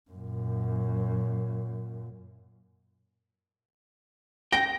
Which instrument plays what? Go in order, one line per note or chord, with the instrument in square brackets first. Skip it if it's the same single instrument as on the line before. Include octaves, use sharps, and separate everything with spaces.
[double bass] F#2 A#2
[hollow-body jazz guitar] G5 [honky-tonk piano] A#6